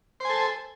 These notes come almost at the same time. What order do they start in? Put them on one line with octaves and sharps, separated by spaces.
C5 G#5 A4